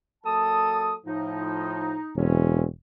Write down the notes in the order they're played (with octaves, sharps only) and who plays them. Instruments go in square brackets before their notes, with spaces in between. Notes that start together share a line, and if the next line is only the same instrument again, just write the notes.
[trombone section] F#3 A#3 A4 [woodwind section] A5 D#6
[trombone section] A2 F3 [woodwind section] D#4
[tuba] E1 [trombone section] E2 C4 C#4